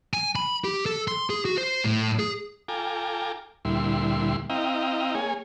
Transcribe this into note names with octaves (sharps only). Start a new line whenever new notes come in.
G#5
B5
G4
A4
C6
G#4
F#4
C5
A2
G#4
F4 A4 G5 G#5 A#5 D6
D2 A#2 G3 E4 C6
C4 E4 D#5 F5 G5 A#5
A#3 G#4 C#5 G#5